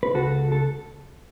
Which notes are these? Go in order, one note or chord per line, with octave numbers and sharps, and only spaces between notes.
B4
C#2 F#4 A4
A4